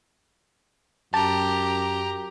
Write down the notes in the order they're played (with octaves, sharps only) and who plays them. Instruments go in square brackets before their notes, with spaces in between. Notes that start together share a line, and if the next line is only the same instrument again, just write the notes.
[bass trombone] F#2 [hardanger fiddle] G4 A#5 [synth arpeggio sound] A5